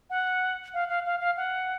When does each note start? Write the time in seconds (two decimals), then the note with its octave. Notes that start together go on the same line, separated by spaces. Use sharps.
0.10 F#5
0.74 F5
0.89 F5
1.05 F5
1.20 F5
1.37 F#5